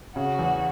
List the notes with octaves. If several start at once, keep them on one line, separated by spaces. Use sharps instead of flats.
C#3 F#4
E2